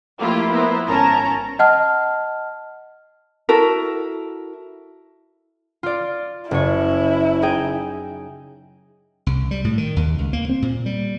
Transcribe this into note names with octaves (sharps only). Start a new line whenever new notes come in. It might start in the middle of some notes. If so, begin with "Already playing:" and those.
F3 A3 A#3 E4 F4 G4
B3 E4 A#4 C5
G#1 C#4 A#4 A5 A#5
D#5 F#5 A5 F6
E4 F#4 A4 A#4
F4 D5
F#1 E4 C#5
D#4 G#4 G5
C2
G3
A2
D#3
D#2
C#2
A#3
C4
A#2
G3